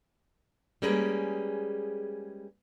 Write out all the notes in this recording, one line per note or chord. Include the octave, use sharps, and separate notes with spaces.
G3 G#3 A#3 C#4 G#4 B4